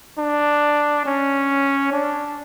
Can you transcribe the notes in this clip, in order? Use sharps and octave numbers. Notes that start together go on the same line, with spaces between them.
D4
C#4
D4